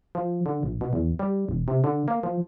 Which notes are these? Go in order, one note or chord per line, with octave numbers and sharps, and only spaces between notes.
F3
D3
A#1
B2
E2
G3
E1
C3
D3
A#3
F3